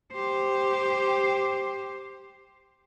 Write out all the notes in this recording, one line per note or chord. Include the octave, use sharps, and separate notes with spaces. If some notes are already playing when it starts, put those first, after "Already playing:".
G4 C5